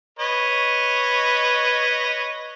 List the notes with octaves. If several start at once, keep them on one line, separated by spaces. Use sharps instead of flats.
B4 C#5 D#5